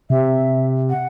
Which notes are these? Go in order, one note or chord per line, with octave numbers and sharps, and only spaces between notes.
C3 E5
F#5